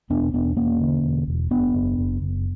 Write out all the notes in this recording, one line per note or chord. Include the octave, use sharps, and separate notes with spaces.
E1 B3 D4
E1 B3 D4
E1 A#3 C#4
D3
E1
E1
F#1 B3 D4
F#1
F#1
F#1